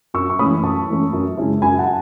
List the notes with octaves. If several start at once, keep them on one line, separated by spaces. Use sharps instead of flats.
F#2 C#6 E6
C#6
E3 A3 C#4 B5 D#6
F#2 A5 C#6
E3 A3 C#4
F#2
C#3 G#3 C#4 E4
F#2 G#5 B5
F#5 A5